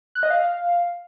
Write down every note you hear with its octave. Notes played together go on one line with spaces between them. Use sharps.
F#6
D#5
F5